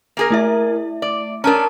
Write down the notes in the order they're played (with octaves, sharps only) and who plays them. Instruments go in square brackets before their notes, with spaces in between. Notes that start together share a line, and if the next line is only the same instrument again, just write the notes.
[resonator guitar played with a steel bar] A#3 G#4 A#4
[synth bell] A3 E4 E5
[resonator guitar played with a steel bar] D5
[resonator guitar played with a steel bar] C#4 D4 [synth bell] A#4 A5 A#5